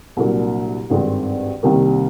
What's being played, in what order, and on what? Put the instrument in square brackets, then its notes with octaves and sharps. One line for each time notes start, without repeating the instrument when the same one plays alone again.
[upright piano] C2 A#2 F#3 A#3 D4
G#1 G2 D#3 G#3 C4
C2 C3 D#3 G3 A#3